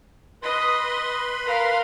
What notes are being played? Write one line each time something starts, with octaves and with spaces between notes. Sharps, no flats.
B4 D#5 B5 C6
A#4 F5